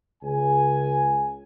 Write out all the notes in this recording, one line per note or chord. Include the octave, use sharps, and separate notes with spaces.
C#2 G#5